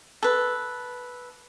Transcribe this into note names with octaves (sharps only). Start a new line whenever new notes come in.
A4 B4